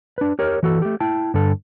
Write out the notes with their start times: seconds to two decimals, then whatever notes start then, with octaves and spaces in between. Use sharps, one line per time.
0.18 D4 B4
0.39 G4 A#4 C#5
0.63 E3 F#4 A4
0.82 A3 G4
1.00 E4 G5 A5
1.34 G2 D3 A4